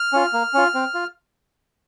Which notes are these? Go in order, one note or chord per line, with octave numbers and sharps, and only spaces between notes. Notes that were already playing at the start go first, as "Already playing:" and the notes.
Already playing: F6
C#4 F4
A#3
C#4 F4
C4
F4